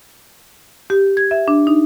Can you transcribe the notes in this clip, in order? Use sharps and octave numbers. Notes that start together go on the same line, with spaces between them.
G4
G#6
E5
D4
D#4